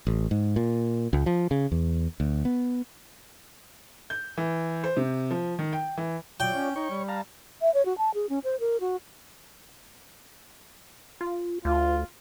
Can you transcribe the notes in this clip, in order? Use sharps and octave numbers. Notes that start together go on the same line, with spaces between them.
A1
G#2
A#2
C#2
F3
C#3
E2
D2
B3
G6
E3
C5
C3
F3
D#3
G5
E3
F#3 F4 C#5 D5 G5
C#4
D#4 C#5 C#6
G3
F5 A5 A#5
E5
C#5
F#4
A5
G#4
C#4
C5
A#4
F#4
F4
D2 F4